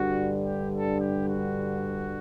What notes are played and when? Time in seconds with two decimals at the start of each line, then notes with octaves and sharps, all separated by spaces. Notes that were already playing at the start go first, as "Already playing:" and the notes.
Already playing: G2 D3 G3 F#4
0.41 G4
0.70 A4
0.97 G4
1.26 F#4